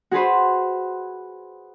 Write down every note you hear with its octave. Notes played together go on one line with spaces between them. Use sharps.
F#4 G#4 B4 C5